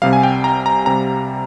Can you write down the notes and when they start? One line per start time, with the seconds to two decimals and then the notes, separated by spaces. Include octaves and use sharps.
0.02 C2 C3 G3 F5
0.13 G#5
0.23 G5
0.44 A#5
0.66 A#5
0.86 C3 G3 A#5